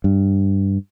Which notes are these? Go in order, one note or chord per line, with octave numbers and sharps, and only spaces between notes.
G2